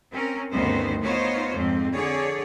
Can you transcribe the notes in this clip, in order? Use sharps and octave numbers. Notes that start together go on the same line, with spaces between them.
C4 C#4 A#4
D2 G2 D#3 B3 C#4 C5
B3 D#4 F4 C5 C#5
F2 G#2 C4
D3 G#4 C#5 D5